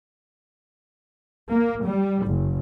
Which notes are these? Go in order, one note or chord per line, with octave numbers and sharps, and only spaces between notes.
A#3
G3
F#1